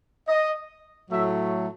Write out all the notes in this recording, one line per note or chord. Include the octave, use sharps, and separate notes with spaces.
D#5
A2 F#3 A3 E5